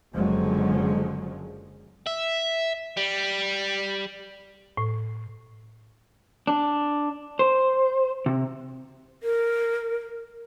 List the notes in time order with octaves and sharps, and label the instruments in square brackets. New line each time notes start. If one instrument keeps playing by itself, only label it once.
[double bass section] F#1 D3 F3 F#3 G#3
[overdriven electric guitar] E5
G3
[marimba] A2
[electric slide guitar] D4
C5
C3
[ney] A#4